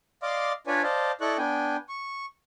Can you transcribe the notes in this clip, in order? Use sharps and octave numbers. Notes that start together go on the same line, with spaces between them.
D5 D#5 F5 C6 D6
D4 F4 B4 C#5 D5 G#5
C5 D5 D#5 F5 A5
E4 A4 D5 D#5 C#6 F#6
B3 D4 G5 G#5
C#6